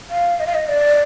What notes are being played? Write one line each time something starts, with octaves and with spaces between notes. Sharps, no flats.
F5
D#5
F5
D#5
D5